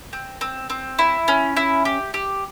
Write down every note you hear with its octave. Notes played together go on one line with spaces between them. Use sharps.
C4
C4
C4
E4
C#4
E4
G4
G4